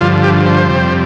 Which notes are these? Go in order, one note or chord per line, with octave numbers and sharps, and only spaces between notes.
G2 D3 F3 F4
G4
C5
F2 C3 G3